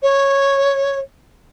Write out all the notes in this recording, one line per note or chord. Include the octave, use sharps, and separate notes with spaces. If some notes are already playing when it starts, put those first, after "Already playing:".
C#5